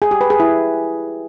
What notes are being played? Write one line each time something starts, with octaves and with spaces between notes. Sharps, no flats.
G#4
G4
B4
G#4
E4